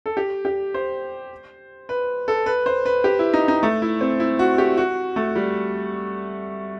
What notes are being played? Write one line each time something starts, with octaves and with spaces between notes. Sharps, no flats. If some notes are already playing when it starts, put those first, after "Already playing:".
A4
G4
G4
C5
B4
A4
B4
C5
B4
G4
E4
D#4
D#4
A3
E4
C4
E4
F#4
G4
F#4
A3
G3